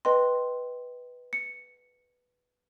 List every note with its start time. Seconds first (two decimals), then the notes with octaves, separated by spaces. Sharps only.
0.05 B4 D#5 G5 C6
1.33 C#7